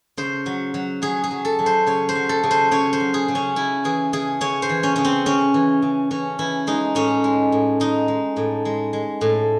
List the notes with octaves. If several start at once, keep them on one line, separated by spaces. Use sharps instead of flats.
C#3 C5
F#3
F#3
F#3 G#4
G#4
F#3
A4
F#3
C5
C#3 C#5
C5
F#3
A4
C#3
C5
C#3 C#5
C5
F#3
G#4
C#3
C#4
C#3 E4
E3 G#4
C#3 G#4
C#3 C#5
C5
E3
C#4
C#3 C#4
C4
C#3 C#4
E3
C#3
E3 C#4
E3 E4
G#3 D#4
A2 C#4
G#3
A2
G#3 D#4
G#3
A2
G#3
G#3
A2